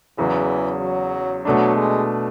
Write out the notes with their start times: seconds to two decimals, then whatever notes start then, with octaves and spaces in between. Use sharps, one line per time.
0.18 E2 C#3 E3 F#3
0.82 F#3
1.45 B2 F#3 A3 D4
1.76 G#3